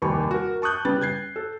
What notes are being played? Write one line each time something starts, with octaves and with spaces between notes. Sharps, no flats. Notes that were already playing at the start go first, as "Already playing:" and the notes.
F1 D#2 G3 C#6
F#4 A#4
A5 C#6 D#6 F#6 G6
C#3 G3 B3 A6
G6 G#6 C7
A4